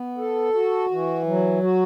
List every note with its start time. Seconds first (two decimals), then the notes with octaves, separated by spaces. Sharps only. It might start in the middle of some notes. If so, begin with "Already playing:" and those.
Already playing: B3
0.18 A4
0.54 F#4
0.91 E3
1.26 F#3
1.63 F#4